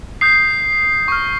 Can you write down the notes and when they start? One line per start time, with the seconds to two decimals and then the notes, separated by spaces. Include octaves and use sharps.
0.21 D#6 G6 C7
1.08 C#6 F6